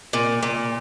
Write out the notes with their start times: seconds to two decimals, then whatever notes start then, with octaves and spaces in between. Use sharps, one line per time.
0.13 A#2
0.43 A#2